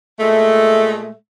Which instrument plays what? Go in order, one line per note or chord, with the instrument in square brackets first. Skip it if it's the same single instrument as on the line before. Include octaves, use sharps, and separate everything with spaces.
[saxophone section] A#2 G#3 A3